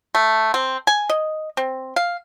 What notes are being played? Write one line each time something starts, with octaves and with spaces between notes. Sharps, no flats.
A3
C4
G#5
D#5
C4
F5